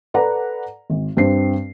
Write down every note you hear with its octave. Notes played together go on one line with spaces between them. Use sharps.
A4 B4 D5 F#5 A#5
G#1
G2 C4 D4 C5 C7